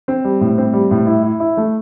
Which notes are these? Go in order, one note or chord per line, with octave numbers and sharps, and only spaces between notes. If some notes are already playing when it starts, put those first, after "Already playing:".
C4
G3
A2
C4
G3
A2
E4
E4
E4
A3